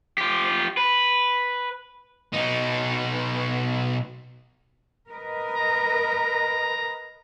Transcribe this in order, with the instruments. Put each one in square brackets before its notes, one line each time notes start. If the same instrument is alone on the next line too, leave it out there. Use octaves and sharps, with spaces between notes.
[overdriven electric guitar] F4 G4
B4
[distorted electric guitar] B2 D#4
[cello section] A#4 B4 D#5
[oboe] A#5